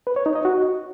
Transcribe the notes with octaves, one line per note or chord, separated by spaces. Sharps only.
B4
C#5
D#4
D#5
F#4